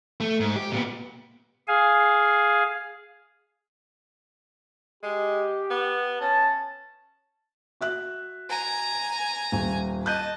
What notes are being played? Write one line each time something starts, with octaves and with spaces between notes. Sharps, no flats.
A3
G#2
G4
A#2 B3
G#4 F5 G#5
G#3 G4
B3
C#4 A5
F#4 E5 F#6
G#5 A#5
D#1
D#5 A5 F#6 G6 D#7